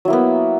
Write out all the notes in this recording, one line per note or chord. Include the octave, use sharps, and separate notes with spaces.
F#3 A#3 B3 E4